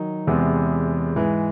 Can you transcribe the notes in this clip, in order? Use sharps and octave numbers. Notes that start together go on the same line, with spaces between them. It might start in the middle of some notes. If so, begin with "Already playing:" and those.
Already playing: D#3 F#3 D#4
E2 C3 E3 G#3 B3
G#2 E3 G#3